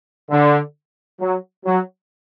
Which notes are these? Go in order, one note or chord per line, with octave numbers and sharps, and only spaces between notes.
D3
F#3
F#3